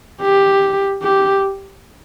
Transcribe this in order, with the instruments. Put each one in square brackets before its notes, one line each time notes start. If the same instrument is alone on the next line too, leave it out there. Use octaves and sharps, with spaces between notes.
[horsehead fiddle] G4
G4